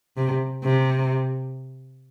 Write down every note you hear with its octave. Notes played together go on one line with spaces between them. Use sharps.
C3
C3